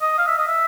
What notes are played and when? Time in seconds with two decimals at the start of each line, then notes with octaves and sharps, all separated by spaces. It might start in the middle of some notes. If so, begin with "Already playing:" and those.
0.02 D#5
0.19 F5
0.28 E5
0.38 D#5
0.48 E5